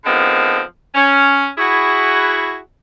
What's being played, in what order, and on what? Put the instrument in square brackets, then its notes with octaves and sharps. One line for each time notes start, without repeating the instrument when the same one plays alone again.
[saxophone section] D3 D#3 F3 G#3 B3 C4
C#4
E4 F#4 G#4